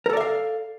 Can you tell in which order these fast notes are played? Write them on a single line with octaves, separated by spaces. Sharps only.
A#4 A4 D5 E5 F5